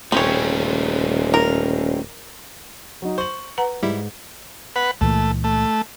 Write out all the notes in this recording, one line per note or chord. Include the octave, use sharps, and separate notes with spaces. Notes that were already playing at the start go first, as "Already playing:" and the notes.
D#1 A3 C4 C#4 G#4 C#5
A#4
F#3 D#4
C5 C#6 F#7
B4 F#5 A#5
G#2 G3 E4
B4 F#5
C#2 A#2 E3 A3
A3